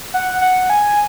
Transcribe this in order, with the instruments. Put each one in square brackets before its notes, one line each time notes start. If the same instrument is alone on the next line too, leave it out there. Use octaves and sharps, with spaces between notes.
[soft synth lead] F#5
F#5
G#5